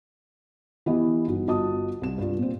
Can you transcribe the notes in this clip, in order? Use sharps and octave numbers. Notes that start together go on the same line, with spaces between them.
E3 B3 G4 D#5
G1 D#4 F#4
G1 F4 F#4 D#5 A5 D#6
C2 E7
G2 F4
A#2 C4